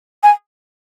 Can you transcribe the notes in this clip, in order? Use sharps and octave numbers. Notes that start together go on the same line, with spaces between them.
G#5